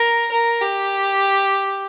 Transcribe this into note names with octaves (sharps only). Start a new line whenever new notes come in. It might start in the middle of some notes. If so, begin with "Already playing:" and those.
Already playing: A#4
A#4
G4